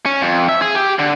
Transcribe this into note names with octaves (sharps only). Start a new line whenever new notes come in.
C#4
F2
E5
G#4
G4
D3